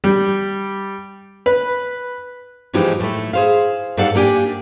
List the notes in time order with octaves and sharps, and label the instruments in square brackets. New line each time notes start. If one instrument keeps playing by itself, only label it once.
[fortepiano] G3
B4
[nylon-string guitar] G#2 E3 F3 G#3 D#4 G4
A2 A3
G#4 C5 F5
G#2 G3 A4 F5 F#5
A#3 D4 G4 G5 G#5